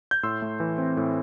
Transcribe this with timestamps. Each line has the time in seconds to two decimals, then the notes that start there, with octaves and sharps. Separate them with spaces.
0.11 G6
0.23 A2 C6 E6
0.42 A3
0.60 E3
0.78 C4
0.97 A2